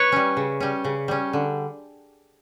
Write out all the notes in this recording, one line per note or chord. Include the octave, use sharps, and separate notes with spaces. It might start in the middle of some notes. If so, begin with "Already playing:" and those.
Already playing: B4 C#5
G3 C#4
C#3
G3 C#4
C#3
G3 C#4
D3